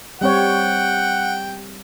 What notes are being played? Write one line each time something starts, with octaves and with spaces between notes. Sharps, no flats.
G3 C4 C#5 F#5 G5